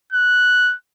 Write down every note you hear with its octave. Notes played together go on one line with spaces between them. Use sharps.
F#6